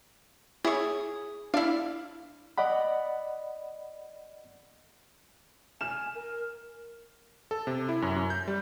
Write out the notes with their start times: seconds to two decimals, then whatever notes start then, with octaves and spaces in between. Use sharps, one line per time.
0.65 E4 G#4 C#5
1.54 D4 E4 F5
2.58 D5 D#5 F#5 B5
5.81 G#5 F6 E7
6.15 A#4
7.51 A4
7.67 C3
7.89 E4
8.02 F#2
8.16 F#2
8.30 G6
8.48 G3